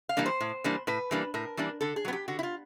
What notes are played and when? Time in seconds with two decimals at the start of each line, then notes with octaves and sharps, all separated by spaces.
0.09 F5
0.17 E3 G3 A#3 D4
0.26 C5
0.41 A2
0.64 E3 G3 A#3 D4
0.87 A2 B4
1.11 E3 G3 A#3 D4
1.34 A2 A#4
1.57 E3 G3 A#3 D4
1.81 D3 A4
1.96 G#4
2.05 F#3 B3
2.13 G4
2.28 D3 F#4
2.39 E4
2.43 F4